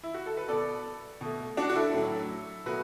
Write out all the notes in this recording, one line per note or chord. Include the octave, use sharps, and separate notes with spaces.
E4
F#4
A4
B4
B2 B3 A4 D5
B2 A3
D4 F#4
F#4
E4 A4
A2 F#3 A3
B2 F#3 A3 F#4 B4